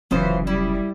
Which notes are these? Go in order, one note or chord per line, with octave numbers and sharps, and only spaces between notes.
F1 B1 C#3 E3 C#4 F4 C5 D#6
G3 E4